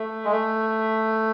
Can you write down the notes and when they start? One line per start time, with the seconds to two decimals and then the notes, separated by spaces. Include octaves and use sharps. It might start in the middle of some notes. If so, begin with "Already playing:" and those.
Already playing: A3
0.25 G#3
0.32 A3